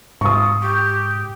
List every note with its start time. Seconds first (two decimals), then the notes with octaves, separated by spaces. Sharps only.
0.21 G#2 F4 C#6 D#6
0.62 G4